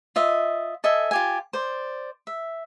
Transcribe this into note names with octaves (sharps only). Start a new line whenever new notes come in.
F4 D#5 E5
A4 D#5 E5 G#5
F4 G4 G#5
C5 D5
E5